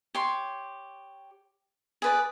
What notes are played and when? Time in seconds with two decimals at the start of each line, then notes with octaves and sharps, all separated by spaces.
0.15 G4 C#5 C6
2.02 G#4 B4 D5